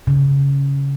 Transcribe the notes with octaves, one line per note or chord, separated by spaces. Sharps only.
C#3